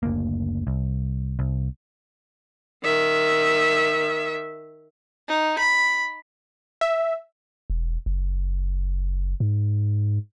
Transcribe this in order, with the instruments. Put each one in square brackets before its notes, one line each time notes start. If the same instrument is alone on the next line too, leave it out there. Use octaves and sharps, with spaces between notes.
[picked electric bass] F#1 D2 A#3
C2
C2
[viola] D#3 E5
[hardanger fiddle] D#4
B5
[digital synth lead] E5
[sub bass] E1
F#1
G#2